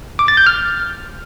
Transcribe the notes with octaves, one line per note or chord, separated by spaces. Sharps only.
D6
A6
G6
F6